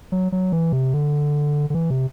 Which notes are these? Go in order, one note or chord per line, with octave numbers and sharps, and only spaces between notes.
F#3
F#3
E3
C3
D3
D3
E3
C3